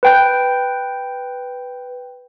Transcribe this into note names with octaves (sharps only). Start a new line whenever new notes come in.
B4 G5 G6